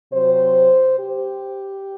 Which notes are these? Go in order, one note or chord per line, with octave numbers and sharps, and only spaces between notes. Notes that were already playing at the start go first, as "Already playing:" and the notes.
C3 F#3 C4 C5
G4